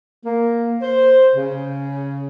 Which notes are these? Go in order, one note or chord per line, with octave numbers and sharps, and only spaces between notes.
A#3
C5
C#3